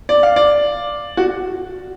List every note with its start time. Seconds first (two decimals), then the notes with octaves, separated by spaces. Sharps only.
0.09 D5
0.23 F5
0.36 D5
1.17 F#4